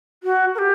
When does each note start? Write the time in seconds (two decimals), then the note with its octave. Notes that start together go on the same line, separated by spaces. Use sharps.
0.23 F#4
0.55 A#4
0.58 G4